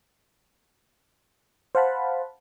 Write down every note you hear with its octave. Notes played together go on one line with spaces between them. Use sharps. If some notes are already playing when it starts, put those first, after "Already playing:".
C5 F5 F#5 A5 B5